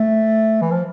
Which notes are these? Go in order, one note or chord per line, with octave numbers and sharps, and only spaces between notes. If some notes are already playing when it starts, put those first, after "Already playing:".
Already playing: A3
E3
F3